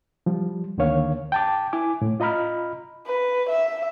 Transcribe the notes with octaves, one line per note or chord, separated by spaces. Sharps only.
F3 G3
D2 D3 D#3 A#3 C#5 F5
G5 A5 D6
E4 G#5 D6
A2
F4 D#5 A#5 B5 F6
B4
E5